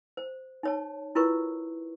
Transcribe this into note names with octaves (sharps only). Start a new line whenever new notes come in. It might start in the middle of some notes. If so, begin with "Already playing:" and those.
C5
D#4 C#5 A5
E4 F4 A#4 B4 C#6